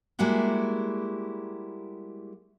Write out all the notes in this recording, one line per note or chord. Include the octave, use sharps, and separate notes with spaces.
G3 G#3 A#3 E4 F#4 G4